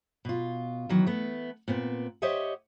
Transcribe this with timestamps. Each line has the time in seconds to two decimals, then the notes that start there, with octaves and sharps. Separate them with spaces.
0.25 B2 F4
0.89 D#3 E3 F#3
1.06 A3 B3
1.68 A#2 B3 C4
2.22 G4 C5 C#5 D#5 E5 F#5